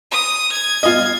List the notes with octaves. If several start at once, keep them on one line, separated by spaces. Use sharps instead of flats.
D#6
G#6
F4 D#5